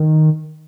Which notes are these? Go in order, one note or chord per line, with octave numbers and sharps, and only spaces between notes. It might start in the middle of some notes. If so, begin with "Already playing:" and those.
Already playing: D#3